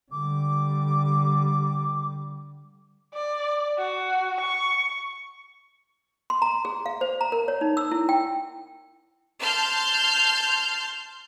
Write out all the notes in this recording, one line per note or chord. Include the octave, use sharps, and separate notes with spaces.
D3 G3 D6
D5
F#4
C#6
C6
A#5
G#4
F5
C5
A#5
A#4
C#5
D#4
E6
E4
G5
A5 C6 F6 G6